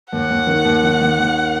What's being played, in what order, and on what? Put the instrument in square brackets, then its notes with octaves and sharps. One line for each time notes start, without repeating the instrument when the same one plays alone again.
[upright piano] D#2 [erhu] F#5
[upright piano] D#2
D#3
D#2
D#3
D#2
D#2